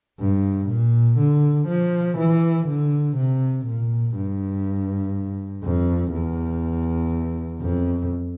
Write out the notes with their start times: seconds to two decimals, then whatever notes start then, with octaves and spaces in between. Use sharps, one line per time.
0.20 G2
0.69 A#2
1.19 D3
1.68 F3
2.18 E3
2.67 D3
3.17 C3
3.66 A#2
4.15 G2
5.64 F2
6.13 E2
7.62 F2